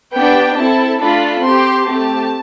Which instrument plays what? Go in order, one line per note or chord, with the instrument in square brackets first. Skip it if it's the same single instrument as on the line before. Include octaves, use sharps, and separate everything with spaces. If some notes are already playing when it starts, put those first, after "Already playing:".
[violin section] B3 D4 G4 G5
C4 E4 A4 A5
A3 D4 F4 A4 B5
C4 G4 C6
A3 C4 G4 A5